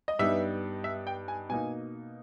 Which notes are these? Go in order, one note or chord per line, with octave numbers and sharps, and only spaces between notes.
D#5
G2 G3 B3 D#4 E5
E5
G5
G#5
B2 A#3 D#4 G#5